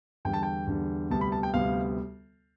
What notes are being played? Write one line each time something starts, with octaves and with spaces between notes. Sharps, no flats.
E2 D3 G3 G5
A5
G5
E2 D3 G3
D2 C3 G3 B3 A5
B5
A5
G5
D2 C3 G3 B3 F5